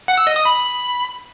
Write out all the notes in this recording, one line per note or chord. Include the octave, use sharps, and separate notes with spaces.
F#5
E6
D#5
D#6
B5